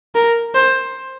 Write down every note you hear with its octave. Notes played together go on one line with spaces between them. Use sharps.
A#4
C5